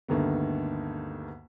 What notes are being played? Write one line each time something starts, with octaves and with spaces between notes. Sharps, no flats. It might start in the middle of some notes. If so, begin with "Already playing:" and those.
D2 G2 D3 D#3 A#3 B3